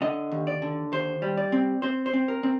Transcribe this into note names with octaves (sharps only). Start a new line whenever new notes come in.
D3 D#5
D#2
D5
D3
D#2 C5
G3
D5
C4
C4 C5
C5
C4
A#4
C4